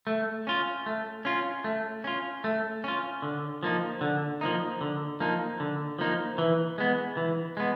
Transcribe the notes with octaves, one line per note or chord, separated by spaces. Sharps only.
A3
C#4 F4
A3
C#4 F4
A3
C#4 F4
A3
C#4 F4
D3
F3 A#3 D#4
D3
F3 A#3 D#4
D3
F3 A#3 D#4
D3
F3 A#3 D#4
E3
G#3 B3
E3
G#3 B3